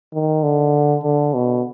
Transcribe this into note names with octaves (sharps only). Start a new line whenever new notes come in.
D#3
D3
D3
B2